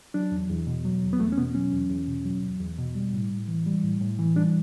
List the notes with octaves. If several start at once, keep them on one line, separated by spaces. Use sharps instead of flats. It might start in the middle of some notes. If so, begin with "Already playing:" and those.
F#3 D4
E2
E2
B2
F#3
E2
B3
E2 A3
C#4
B2 B3
F#3 C#4
E2
E2
B2
F#3
E2
E2
B2
G3
A2
A2
E3
G3
A2
A2
E3
G3 D4